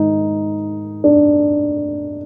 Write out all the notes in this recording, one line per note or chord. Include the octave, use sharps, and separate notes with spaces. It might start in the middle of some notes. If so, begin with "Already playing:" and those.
Already playing: G#2 D#3 D#4
D4